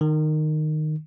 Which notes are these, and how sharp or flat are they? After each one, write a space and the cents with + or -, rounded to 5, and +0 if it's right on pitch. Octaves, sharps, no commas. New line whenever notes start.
D#3 -15